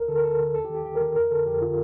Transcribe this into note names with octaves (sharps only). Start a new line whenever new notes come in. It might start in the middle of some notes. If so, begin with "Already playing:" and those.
Already playing: D2 A#4
D3 A4
A#4
D2 A4
D3
D#2 A4
G4
D#3
G4
D#2 G4
A#4
D#3
F2 A#4
D3 A4
F2 G4
D3 F4